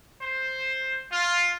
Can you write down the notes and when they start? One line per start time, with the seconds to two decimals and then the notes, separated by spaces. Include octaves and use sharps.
0.22 C5
1.12 F4